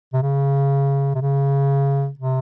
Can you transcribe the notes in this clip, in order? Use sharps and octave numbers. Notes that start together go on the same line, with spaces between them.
C3
C#3
C3
C#3
C3